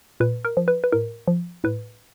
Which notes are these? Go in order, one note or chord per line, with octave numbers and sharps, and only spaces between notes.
A#2 B4
A#4
F3
B4
B4
A2 A#4
F3
A2 B4